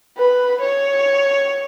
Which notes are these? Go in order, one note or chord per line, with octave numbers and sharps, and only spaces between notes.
B4
C#5